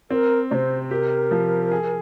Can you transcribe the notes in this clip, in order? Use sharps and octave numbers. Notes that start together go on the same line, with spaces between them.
C4 A#4
C3 C5 D5
G4 A#4
F3
G#4